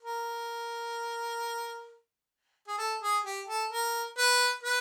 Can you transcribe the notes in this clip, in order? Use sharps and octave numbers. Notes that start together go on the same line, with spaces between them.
A#4
G#4
A4
G#4
G4
A4
A#4
B4
B4